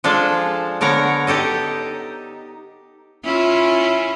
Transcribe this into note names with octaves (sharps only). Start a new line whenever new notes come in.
F3 G#3 D4 A4
D3 B3 A#4 C#5 A#5
D#4 G4 A4 D#5
C#4 E4 F4